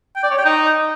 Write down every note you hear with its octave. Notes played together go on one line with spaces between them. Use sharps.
G5
D5
C#5
G5
D#4